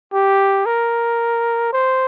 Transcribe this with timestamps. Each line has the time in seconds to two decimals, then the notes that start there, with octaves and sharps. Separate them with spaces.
0.13 G4
0.66 A#4
1.73 C5